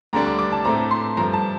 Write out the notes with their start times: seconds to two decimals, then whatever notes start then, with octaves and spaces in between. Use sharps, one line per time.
0.13 D2 D3 G3 D4 A#5
0.26 D6
0.39 D6
0.52 A5
0.65 A2 A3 C4 A#5
0.91 C6
1.17 G2 F3 A3 A#5
1.33 A5